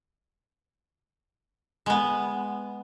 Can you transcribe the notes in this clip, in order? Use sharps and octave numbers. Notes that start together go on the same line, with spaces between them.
G#3 B3